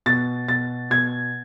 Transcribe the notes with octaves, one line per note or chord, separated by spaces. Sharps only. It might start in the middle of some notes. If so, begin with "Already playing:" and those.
B2 A6
B2 A6
B2 G#6